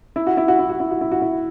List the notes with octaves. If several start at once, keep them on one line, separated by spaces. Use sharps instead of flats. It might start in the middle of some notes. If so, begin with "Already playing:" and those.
E4
F#4
E4
F#4
E4
F#4
E4
F#4
E4
F#4
E4